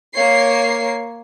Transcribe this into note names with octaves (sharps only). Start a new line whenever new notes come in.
A#3 C#5 C7